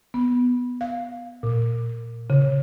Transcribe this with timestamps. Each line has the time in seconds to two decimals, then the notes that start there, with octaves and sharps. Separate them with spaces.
0.14 B3
0.81 F5
1.43 A#2
2.30 C#3